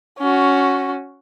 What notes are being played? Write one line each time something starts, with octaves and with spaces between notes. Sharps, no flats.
C#4 F#4